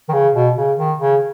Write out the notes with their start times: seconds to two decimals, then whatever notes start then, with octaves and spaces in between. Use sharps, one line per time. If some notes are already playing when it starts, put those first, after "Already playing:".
0.09 D#3
0.13 C#3
0.34 B2
0.56 C#3
0.78 D#3
1.00 C#3